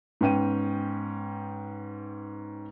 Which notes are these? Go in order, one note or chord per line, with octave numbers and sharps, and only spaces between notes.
G#2 B3 C#4 G5 D#7